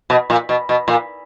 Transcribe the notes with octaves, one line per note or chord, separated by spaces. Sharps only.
B2
A#2
B2
B2
A#2